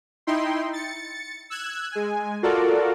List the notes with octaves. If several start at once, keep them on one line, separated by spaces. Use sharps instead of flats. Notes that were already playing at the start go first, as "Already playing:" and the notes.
D#4 E4 G5 C6
A6 C#7
E6 F#6 G#6
G#3 G#5
F4 F#4 A4 A#4 D5